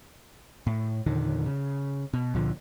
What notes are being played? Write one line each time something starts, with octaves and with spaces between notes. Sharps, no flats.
A2
E2 A#2 D3 D#3
C#3
B2
C#2 A#2 D3 F3